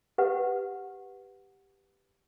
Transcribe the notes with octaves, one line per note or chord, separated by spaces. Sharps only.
G4 B4 F#5